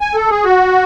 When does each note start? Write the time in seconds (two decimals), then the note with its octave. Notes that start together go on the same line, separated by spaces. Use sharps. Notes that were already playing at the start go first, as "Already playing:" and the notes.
0.01 G#5
0.15 A4
0.30 G#4
0.44 F#4